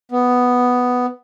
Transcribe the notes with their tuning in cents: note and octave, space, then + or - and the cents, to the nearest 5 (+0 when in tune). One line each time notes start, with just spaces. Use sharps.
B3 +5